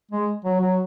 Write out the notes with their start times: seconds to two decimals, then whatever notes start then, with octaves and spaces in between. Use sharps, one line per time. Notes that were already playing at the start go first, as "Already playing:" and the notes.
0.11 G#3
0.44 F#3
0.60 F#3